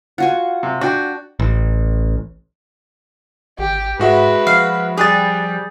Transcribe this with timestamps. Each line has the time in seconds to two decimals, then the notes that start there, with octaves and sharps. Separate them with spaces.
0.18 F4 F#4 F#5 G#5
0.63 C3
0.81 D4 F#4 G5
1.39 A1
3.59 G#1 G4
3.99 G#2 G#3 F#4 B4 E5
4.47 F3 F5
4.97 G3 G4 G#4 F#6 A6